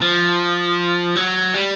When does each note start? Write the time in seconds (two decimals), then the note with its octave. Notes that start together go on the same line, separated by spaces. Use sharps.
0.02 F3
1.16 F#3
1.54 G3